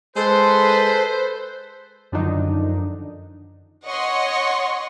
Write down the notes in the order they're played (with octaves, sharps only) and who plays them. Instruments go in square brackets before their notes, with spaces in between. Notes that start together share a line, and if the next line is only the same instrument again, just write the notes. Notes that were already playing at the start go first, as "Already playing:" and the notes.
[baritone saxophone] G#3 [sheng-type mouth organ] A4 C6 [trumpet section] B4 [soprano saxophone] C5
[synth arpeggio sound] F#2 D3 D#3 F3 D4 D#4
[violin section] C#5 D#5 F#5 C6 C#6